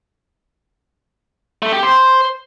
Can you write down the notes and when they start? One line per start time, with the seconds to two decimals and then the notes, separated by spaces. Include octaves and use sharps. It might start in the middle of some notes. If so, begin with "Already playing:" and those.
1.62 A3
1.73 G4
1.83 C5